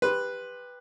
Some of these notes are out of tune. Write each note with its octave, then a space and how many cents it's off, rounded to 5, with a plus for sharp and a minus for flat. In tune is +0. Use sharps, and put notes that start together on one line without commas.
G4 +20 B4 +0 C6 +0